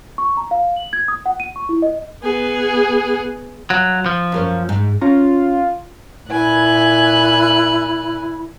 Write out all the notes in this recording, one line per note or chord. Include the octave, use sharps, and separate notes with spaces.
C#6
A#5
F5
F#7
G#6
D#6
F#5
D#7
C#6
E4
D#5
B3 G#4
F#3 F4
F3
F#2 A#3 C#4
G#2
C#4 F4 A#5
A#2 E4 G#5 F#6